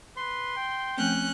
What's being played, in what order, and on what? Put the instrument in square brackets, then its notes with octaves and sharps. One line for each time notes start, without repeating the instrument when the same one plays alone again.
[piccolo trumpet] B4 [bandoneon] C6
[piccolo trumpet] G5
[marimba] F3 A3 C4 [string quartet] C#4 F#6 G6